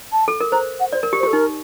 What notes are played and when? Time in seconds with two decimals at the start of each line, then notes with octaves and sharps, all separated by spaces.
0.12 A5
0.28 A4
0.40 A#4
0.52 C5 A#5
0.80 F#5
0.93 C5 D5
1.03 A#4
1.13 G4
1.19 C5
1.23 G4 A4
1.33 D#4 A#4